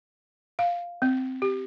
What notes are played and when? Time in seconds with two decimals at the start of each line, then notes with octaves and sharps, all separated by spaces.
0.59 F5
1.02 C4
1.42 G4